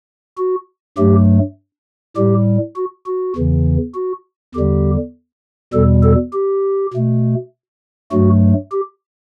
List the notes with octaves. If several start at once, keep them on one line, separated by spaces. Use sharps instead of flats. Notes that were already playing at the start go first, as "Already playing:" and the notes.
F#4
G2 F#3 A3 G4
A2 G3 G4
F#4
F#4
E2 C#3 E3
F#4
E2 D3 G3 G4
E2 B2 G3 A4
A4
G4
B2 A3
G2 F#3 A3 F#4
G4